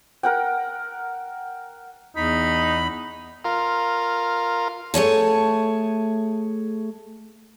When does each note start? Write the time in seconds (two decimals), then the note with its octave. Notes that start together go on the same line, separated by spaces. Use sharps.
0.23 A#4 F#5 G5
2.16 E2 D#4 B5
3.45 F4 A#4
4.94 A3 G#4 C#5 A5